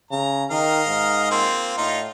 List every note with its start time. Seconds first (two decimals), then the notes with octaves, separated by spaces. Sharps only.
0.11 C#3 A#5
0.51 D#3 A#4 D#5 F5
0.88 G#2
1.31 A#3 C4 F4
1.78 A2 D#4 F4